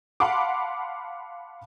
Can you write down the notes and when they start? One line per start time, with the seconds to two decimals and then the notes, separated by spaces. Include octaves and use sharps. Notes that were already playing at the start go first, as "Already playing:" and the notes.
0.20 F5 F#5 A5 B5 C6 D6